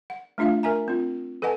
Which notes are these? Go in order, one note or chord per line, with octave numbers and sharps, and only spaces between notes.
F#5
A3 D4 F4 E5 F5
A#4 E5 G#5 A#5
C4 F4
A4 B4 D#5 F#5 G#5 A5